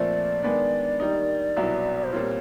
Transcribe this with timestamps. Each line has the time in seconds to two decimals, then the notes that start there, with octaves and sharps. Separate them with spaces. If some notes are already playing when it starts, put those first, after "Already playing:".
Already playing: A#2 F3 A3 C4 D5
0.42 D#3 G#3 B3 D4
1.00 D#3 G3 A#3 D#4
1.56 C2 B2 F#3 B3 E4
2.04 C5
2.13 A#2 G3 C4 F4 C#5